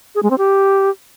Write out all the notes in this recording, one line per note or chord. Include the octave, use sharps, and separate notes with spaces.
G#4
G#3
C4
G4